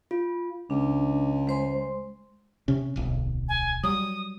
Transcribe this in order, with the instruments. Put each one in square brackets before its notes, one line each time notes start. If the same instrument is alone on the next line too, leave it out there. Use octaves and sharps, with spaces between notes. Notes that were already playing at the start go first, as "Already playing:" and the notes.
[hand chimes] F4
[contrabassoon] C#2 [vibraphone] D4
[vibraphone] G#3 C5 C6
[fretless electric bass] C3 C#4
D1 B1
[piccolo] G#5
[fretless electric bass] F#3 G3 [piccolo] D#6